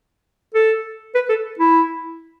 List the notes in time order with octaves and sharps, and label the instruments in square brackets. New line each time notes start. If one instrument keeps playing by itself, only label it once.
[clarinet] A4
B4
A4
E4